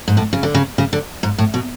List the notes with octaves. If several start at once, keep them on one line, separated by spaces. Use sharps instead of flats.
G#2
A2
C#3
D3
C#3
C#3
D3
G#2
A2
B2